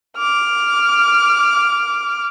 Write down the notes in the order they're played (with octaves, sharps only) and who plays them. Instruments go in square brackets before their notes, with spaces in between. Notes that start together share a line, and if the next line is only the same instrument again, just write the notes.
[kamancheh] D6 F6